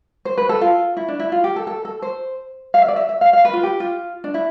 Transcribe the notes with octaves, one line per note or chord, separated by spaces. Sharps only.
C5
B4
A4
F4
E4
D4
E4
F4
G4
A4
A4
A4
C5
F5
E5
D5
E5
E5
F5
F5
B4
F4
G4
F4
D4
E4